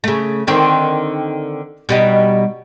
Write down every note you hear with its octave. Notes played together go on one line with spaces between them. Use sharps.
C#3 A3
D3 D#3 C4
B2 G3 D#4